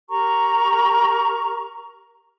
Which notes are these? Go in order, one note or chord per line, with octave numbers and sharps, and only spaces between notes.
G4 A#4 A#5 C#6